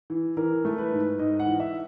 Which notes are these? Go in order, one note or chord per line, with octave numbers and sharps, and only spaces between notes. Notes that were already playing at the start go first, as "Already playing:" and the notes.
E3
E3 A#4
A3
B4
G#2
G#2 D#5
F#5
E3
E5